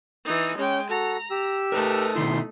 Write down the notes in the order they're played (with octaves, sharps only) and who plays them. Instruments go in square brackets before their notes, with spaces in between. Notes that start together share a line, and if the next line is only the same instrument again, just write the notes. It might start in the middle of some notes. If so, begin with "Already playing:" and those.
[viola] E3 D#4
[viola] G#3 G5 [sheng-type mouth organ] C#4
[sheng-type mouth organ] F#4 A4 [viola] A#5
[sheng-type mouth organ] G4 E6
[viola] A3 D#4 [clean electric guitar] A#4 B4 A5
[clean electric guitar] B2 D#3 E4 [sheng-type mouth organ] C6